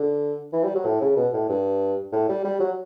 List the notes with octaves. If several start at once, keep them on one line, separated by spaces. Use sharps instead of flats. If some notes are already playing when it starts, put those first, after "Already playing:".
Already playing: D3
E3
G3
F#3
A2
C#3
B2
A2
G2
A2
G3
G3
F#3